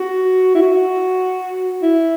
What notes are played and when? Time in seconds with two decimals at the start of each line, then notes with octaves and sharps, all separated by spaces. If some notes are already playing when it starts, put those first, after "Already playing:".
Already playing: F#4
0.55 E4
0.62 F#4
1.83 E4